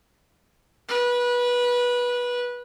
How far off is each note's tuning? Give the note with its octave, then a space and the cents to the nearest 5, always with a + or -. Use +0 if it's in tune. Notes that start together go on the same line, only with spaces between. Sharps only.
B4 -20